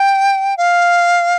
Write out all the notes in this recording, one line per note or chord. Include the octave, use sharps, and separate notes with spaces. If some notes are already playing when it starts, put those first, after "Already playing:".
Already playing: G5
F5